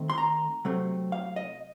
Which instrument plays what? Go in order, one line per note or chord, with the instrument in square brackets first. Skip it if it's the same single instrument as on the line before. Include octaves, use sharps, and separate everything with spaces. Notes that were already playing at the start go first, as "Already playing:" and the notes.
Already playing: [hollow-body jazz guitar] D#3 A3 C4
C6
A#5
C3 F#3 A3 C4
F5
D#5